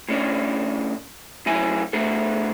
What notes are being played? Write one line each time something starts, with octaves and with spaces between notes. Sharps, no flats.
A2 C#4 D4
A2 F#3 C#4 E4 G#5
A3 B3 D4 A4